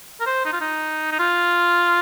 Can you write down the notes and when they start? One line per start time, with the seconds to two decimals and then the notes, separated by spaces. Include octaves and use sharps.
0.21 A#4
0.26 C5
0.45 D#4
0.53 F4
0.61 D#4
1.11 D#4
1.19 F4